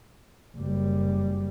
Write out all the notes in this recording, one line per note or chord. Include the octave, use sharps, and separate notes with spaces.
F#1 G3